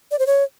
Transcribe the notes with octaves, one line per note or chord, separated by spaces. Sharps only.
D5
C5
C#5